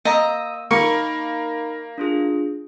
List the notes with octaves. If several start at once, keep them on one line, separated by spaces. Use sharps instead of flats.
A#3 D#5 A#5 E6
A#3 D#4 A#5 B5 C#6
D4 F4 G#4